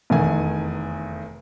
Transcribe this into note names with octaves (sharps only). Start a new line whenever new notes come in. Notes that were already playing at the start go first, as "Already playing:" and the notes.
F1 E2 D#3 G#5